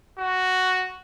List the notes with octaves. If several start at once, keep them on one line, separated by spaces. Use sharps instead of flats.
F#4